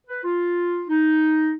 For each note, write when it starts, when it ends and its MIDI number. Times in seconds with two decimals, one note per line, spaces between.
0.07 0.21 71
0.24 0.82 65
0.88 1.53 63